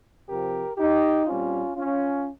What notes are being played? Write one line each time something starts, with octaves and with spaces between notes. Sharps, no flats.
F2 C3 F3 C4 G4 A#4
D#4 G4
A#2 G3 C4 C#4 F4
C#4 F4